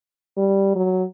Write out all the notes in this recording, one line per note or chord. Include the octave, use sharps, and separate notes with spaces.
G3
F#3